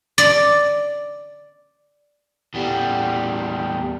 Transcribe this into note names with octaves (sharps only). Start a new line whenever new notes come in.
D5
E2 G3